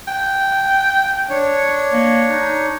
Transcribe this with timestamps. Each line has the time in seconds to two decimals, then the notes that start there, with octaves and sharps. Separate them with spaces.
0.08 G5
1.30 D4 C#5
1.92 A#3
2.29 D#4